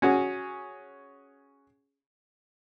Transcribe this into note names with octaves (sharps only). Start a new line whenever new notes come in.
C#4 F#4 G#4